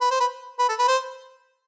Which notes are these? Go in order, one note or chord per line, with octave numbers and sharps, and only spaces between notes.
B4
C5
B4
B4
A4
B4
C5